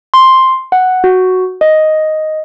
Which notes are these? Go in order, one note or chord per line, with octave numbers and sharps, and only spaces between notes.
C6
F#5
F#4
D#5